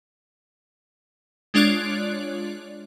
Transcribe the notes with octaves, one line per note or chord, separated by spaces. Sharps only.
G#3 D4 F4 C#5 D5 F#6